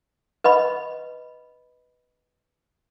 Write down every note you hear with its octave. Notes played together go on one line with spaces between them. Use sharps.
B4 D#5 B5